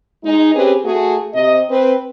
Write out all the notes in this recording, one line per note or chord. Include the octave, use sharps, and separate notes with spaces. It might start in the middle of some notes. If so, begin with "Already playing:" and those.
G#3 D#4
C4 C#4 G4 G#4 B4
A3 F#4 G#4
C3 D#5
C4 B4